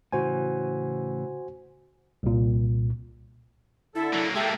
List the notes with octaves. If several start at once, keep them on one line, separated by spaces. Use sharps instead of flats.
A2 C#3 E3 F#4 C5 G#5
C2 A#2
D3 E4 A4
F#3 A#3
G#3 A#3 G4 A4 E5